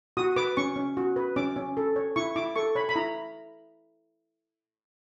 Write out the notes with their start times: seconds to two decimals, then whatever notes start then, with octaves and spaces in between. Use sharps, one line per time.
0.17 F#4 D#6
0.36 B4 D6
0.57 C#4 C#6
0.76 C#4
0.97 F#4
1.16 B4
1.36 C#4 D6
1.56 C#4
1.77 A4
1.96 C#5
2.16 E4 C#6
2.36 E4 D6
2.56 A4 C#6
2.75 C#5 B5
2.89 B5
2.96 E4 A#5